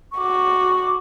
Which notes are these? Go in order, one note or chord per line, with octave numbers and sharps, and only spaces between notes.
C#6
F#4 D6
D6